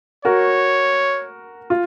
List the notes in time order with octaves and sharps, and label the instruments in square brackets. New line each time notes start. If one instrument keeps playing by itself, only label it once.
[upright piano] F#4 A#4 [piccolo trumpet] C#5
[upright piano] F4